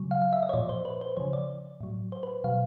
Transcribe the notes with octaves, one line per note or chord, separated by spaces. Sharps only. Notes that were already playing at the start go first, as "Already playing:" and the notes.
Already playing: C#3 F#3
F5
F5
E5
D#5
C#5
A#2 F3 D5
C5
B4
C5
C#3 F3 C#5
D5
A2 F#3
C5
B4
B2 F#3 F5